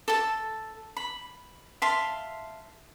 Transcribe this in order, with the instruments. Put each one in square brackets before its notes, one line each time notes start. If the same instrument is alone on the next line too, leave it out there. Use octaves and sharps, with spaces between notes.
[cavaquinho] A4 A5
B5
E5 F5 A5 C6